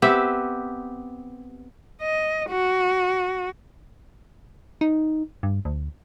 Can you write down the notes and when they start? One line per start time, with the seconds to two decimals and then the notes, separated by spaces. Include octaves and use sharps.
0.02 B3 C4 G4 E5
2.01 D#5
2.50 F#4
4.81 D#4
5.43 G2
5.65 D2